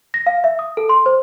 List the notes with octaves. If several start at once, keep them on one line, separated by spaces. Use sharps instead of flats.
A#6
F5
E5
D#6
A4
C6
C5